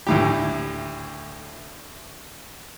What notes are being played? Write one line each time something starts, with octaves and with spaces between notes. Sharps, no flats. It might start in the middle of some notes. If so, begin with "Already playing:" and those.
D2 A2 G4